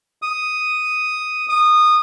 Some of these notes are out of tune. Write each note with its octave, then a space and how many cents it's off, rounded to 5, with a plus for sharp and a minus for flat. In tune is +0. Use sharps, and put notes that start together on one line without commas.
D#6 +0
D#6 -20